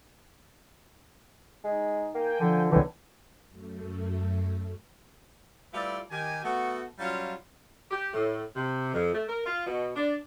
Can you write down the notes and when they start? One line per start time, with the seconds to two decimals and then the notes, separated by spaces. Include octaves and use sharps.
1.64 G#3 D#4
2.14 A#3 G5 G#5
2.40 D3 F3
2.72 C2 D3 E3 B4 C#5 G5 G#5
3.49 F#2 A3
5.73 G3 A3 E4 F4 B4 D5
6.11 D#3 G4 G#5
6.43 A3 B3 F#4
6.98 F#3 G3 C#4 F4
7.91 G4
8.13 A2
8.55 C3
8.93 F2
9.13 A3
9.29 A#4
9.46 F4
9.66 B2
9.95 D4